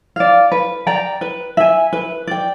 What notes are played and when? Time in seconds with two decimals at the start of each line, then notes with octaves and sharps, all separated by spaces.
0.16 D5 F5
0.52 B4
0.87 D5 G5 A#5
1.21 B4
1.57 E5 G#5
1.93 B4
2.27 D5 G5